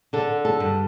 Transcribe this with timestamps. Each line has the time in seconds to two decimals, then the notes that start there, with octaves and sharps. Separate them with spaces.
0.13 D3 A4
0.45 A4
0.60 G2